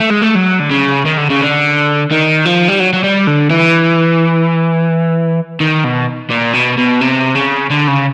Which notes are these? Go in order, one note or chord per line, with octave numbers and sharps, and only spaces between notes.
A3
G#3
A3
F#3
D3
C#3
D#3
D3
C#3
D3
D#3
F3
G3
F#3
F#3
G3
D3
E3
D#3
B2
A#2
B2
B2
C3
C#3
D3
C#3